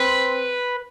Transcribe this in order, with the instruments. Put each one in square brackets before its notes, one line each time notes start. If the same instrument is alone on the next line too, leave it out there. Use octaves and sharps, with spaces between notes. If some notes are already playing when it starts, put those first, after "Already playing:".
Already playing: [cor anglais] C4 [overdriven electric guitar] B4